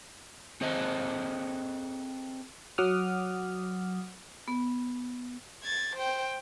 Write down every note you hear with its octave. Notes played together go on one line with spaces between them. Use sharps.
C4 G#4 A4 C5 D#5
F#3 F#5 D6 D#6 F6
B3
G#6 A6
C5 G5